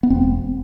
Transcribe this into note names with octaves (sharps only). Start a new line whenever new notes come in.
B3
E1 C4